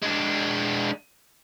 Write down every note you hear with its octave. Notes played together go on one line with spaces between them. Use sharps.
G#3 D4